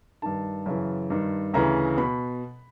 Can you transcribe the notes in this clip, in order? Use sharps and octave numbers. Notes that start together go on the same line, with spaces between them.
G2 D#3 A5
F#2 C#3 E3
G2 D#3
D2 C#3 E3 A#5
B2 B5